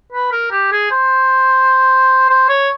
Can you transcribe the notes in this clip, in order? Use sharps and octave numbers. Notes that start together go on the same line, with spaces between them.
B4
A#4
G4
G#4
C5
C5
C#5